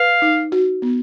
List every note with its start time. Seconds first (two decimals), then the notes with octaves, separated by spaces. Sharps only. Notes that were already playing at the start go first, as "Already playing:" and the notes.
Already playing: B4 F5
0.22 D#4
0.52 F#4
0.82 B3